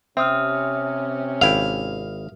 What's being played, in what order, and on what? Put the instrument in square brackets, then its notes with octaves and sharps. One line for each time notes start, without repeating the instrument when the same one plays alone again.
[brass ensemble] C3 C#4 [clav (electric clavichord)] C4 [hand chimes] E5 D#6 F6
[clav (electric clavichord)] G#1 E4 G5 [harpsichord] F5